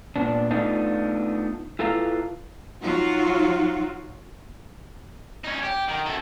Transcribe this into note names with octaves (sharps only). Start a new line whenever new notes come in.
A#2 B3 D4
A3 B3 D4 D#4 F4
E4 F4 A4 B4 F5 A#5
F#3 D#4 F4 F#4
C#4 D#4
G4
D#3
F#2 A4